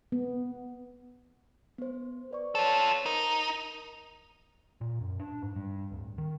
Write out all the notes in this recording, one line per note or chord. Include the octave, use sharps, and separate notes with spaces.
B3
B3 C5
B4 D5 C#6
F4 A4 C5 C#5 C#6
D#4 A#4
A#2
F#2
D4
G#2
G2
D1
D#3